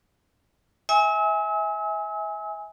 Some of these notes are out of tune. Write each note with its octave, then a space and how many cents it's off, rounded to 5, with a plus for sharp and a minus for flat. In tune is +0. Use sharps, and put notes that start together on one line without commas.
E5 -30 G#5 +0 E6 -45